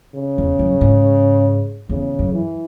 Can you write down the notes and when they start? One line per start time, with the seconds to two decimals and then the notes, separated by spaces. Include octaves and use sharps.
0.16 C#3
0.38 E2
0.59 F#2
0.81 G#2
1.89 E2 C#3
2.19 F#2
2.33 E3